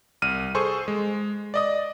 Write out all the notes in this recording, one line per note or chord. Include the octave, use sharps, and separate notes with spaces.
C2 F6 D#7
G#4 A4 C5 C6 C#6
G#3
D5 D#5 D#6